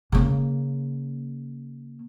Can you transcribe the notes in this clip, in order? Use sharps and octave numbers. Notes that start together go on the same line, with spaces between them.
C#3 A#3